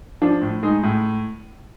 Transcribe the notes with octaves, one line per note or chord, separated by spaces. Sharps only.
F3 D4
A2
G#3 D#4
A2